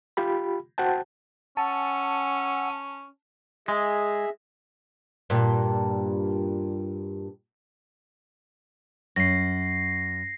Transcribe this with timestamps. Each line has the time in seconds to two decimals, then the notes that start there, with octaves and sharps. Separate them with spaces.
0.17 F4 G4 B5
0.78 F#4 C5 F#5 G5 A5
1.57 C#4 F#5 G#5 A5 E6
3.68 G#3 G#4 E5
5.30 G2 A#2
9.16 F#2 A#6 C7